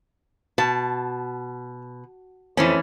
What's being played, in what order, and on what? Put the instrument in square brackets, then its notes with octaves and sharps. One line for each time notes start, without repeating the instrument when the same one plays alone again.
[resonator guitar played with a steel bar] B2 [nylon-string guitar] A5
[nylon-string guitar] F2 [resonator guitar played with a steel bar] E3 A3 C#4